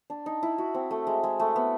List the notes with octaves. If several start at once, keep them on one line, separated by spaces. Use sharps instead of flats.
D4
D#4
E4
F#4
C4
A3
G#3
G#3
A3
B3